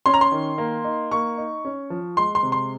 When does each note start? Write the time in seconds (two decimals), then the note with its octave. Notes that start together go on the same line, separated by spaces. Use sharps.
0.06 C#4 C6
0.14 A#5
0.21 C6
0.32 D#3
0.58 A#3
0.84 D#4
1.11 A#3 C#6
1.38 D#4
1.65 C#4
1.90 F3
2.17 G#3 C6
2.35 C6
2.43 C3
2.52 C6